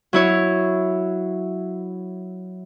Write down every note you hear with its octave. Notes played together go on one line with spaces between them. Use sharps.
F#3 E4 C#5